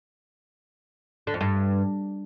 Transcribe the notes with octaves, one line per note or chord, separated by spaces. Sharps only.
D3
F2
G2